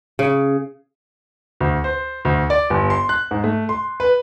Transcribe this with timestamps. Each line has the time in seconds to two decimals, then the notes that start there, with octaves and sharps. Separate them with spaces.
0.19 C#3
1.60 D2
1.84 C5
2.25 D2
2.50 D5
2.70 G1
2.90 C6
3.09 F#6
3.31 G#2
3.44 A3
3.69 C6
4.00 B4